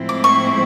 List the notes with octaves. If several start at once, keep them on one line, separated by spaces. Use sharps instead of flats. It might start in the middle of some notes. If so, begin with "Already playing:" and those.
Already playing: A2 F3 G#3 C4 E4
D6
C#6